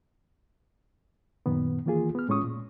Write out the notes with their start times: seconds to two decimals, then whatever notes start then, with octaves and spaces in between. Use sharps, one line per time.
1.46 F#2 A#2 D#3 B3
1.85 D#3 E3 A#3 F4 G#4
2.15 B3 F6
2.29 A2 G#3 C#4 F4 C#6 D#6
2.44 A#2